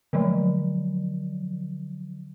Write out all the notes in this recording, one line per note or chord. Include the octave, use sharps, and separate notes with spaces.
D3 F3 F#3